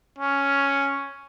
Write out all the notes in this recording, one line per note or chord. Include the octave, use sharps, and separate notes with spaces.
C#4